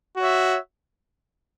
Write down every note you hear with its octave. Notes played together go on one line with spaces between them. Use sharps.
F#4 C#5 E5